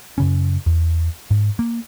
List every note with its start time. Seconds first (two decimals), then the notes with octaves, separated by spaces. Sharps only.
0.18 F#2 C#3 C#4
0.66 E2
1.31 G#2
1.59 A#3